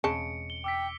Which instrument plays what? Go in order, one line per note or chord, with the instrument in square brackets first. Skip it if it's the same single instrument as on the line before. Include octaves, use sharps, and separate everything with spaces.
[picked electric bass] E1 C4 [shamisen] C#3 G#3 A5 [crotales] C#7 D7
[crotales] G7
[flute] G5 [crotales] D6 E6 B6